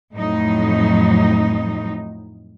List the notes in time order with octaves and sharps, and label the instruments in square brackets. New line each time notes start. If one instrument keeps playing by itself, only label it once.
[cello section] F2 A2 F#3 D#4